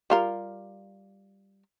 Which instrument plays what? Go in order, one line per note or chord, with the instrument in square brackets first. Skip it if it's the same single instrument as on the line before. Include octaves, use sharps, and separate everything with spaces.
[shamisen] G3 F4 A#4